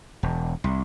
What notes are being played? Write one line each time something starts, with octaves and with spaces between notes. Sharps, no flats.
E1
C2